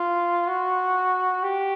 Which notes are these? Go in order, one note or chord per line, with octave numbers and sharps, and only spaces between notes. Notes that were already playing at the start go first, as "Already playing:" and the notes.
Already playing: F4
F#4
G4